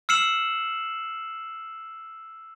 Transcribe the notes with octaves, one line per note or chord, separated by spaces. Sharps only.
E6 F6 C7 C#7 E7 F#7